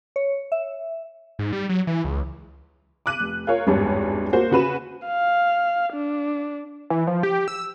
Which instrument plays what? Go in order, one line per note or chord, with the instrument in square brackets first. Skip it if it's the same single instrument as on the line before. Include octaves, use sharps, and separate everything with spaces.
[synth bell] C#5
E5
[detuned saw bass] G#2
G3
F#3
E3
C#2
[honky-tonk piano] D6 F#6 D#7
F1
F4 A#4 C#5
G#1 E2 G2 G3 C#5
A#3 F#4 C5
C#3 F#4 B4 E7
[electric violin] F5
D4
[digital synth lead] E3
F3
G4
E6